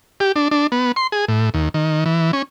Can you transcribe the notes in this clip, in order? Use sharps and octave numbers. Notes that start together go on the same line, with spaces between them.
G4
D4
D4
B3
C6
G#4
A2
D#2
D#3
E3
C#4